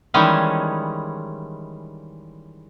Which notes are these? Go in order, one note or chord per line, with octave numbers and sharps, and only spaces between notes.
D#3 E3 G3 G#3 C#4